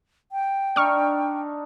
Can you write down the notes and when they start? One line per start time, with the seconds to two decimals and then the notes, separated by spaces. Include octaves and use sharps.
0.32 G5
0.76 D4 D#4 C#6 F6